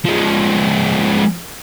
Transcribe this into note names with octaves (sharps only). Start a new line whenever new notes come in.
F3 G#3